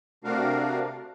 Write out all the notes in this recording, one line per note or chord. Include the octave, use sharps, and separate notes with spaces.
C3 A3 D4 F#4 A#4 F5